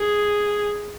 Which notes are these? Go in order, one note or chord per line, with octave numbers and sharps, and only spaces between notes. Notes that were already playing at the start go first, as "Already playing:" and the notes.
Already playing: G#4